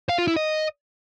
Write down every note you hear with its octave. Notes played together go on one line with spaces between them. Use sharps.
F5
F4
E4
D#5